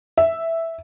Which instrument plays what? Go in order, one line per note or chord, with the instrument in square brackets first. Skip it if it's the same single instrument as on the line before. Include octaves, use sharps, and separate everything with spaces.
[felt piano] E5